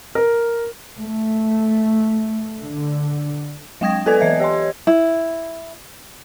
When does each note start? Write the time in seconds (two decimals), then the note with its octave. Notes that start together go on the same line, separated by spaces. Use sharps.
0.15 A#4
1.00 A3
2.61 D3
3.81 F#3 G#3 G5 D#6 G#6 A#6
4.06 B3 A4 B4 D5 G#5 G#6
4.20 E3 D#5 E5 G#6
4.40 G4 C#5 D#5 C6
4.87 E4